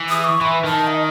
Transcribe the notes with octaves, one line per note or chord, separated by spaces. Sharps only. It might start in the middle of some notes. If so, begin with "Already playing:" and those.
Already playing: E3
D#6
C#6
E3 B5
D#3 A5
E5
D#5